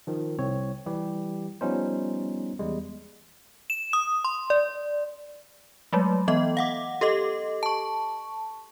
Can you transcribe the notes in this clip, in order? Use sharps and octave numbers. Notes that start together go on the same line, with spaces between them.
D#3 F3
C2 C4 C#5
E3 G3 G4
F3 G3 B3 C#4 D#4 C5
E2 G3 G#3
E7
D#6
C6
D5
F#3 G#3 A3
E3 B3 D#5
F5 F#5 D6
G4 A4 D#5 D6
A5 C#6